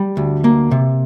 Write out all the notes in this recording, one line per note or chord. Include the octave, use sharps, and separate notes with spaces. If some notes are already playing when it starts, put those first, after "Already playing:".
Already playing: G3
D2
A#3
C3